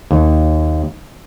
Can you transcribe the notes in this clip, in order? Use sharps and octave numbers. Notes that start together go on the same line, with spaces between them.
D#2